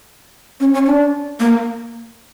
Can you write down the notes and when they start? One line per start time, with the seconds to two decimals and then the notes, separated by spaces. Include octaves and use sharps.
0.60 C#4
0.74 C#4
0.86 D4
1.40 A#3